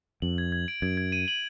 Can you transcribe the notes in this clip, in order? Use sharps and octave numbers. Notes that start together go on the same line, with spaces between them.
F2 F#7
G#6
G#6
D7
F#2 G#6
G#6
D#7
F#7